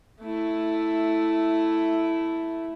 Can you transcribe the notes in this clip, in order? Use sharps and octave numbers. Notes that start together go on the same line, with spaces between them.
A3 E4